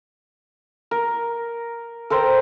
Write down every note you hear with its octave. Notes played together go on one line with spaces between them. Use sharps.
A#4
A4 A#4 C5 G5